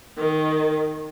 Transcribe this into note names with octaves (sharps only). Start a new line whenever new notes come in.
D#3